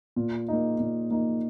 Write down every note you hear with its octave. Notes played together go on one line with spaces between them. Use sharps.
A#2
A#3 D#4
A#2
A#3 D#4